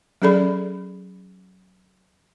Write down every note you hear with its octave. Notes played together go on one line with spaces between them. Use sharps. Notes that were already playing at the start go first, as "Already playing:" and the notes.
F#3 C#4 G#4 A4 D5 B5